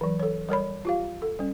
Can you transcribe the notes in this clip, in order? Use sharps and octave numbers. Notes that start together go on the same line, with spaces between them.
E3 F#3
A4 C#5
G3 A#4 C#5 B5
F4 G4 F5
A4
G3 C#4